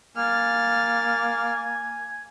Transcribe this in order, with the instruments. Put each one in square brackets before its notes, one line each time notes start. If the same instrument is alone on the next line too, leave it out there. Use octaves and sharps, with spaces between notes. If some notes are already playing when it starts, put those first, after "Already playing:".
[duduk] A#3 [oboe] G#5 [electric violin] F6 A6